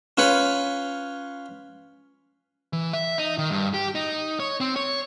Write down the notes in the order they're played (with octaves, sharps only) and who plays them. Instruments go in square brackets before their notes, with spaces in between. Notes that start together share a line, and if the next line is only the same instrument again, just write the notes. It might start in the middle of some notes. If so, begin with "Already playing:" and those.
[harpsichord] C#4 F4 B4 C#5 B5
[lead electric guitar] E3
E5
D#4
D#3
G2
G4
D#4
C#5
C4
C#5